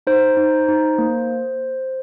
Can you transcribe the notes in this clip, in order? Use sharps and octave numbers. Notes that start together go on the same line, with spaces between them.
D#4 C5
D#4
D#4
A#3